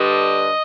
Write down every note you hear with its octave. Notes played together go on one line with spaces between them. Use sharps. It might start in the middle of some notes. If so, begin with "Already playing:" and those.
Already playing: G2 D3 G3 D#5